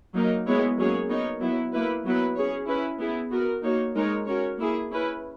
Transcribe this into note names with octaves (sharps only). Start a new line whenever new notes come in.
F#3 A#3 D#4 A#4
G#3 B3 E4 G#4 C#5
F#3 A#3 C#4 G#4 C#5
B3 D#4 A#4 C#5
F#3 B3 E4
A#3 E4 B4
F#3 B3 E4 B4
C#4 G#4 C#5
C#4 E4 B4
B3 E4 G#4
B3 F#4 A#4
A#3 D#4 F#4 C#5
G#3 D#4 A#4 C#5
C#4 F#4 A#4 C#5
A#3 E4 G#4
C#4 E4 B4